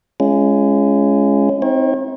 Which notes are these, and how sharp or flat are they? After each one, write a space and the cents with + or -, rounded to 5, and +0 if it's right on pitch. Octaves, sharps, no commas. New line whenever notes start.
G#3 +0 C#4 +0 F4 -45
C4 +0 D#4 +30 C#5 -40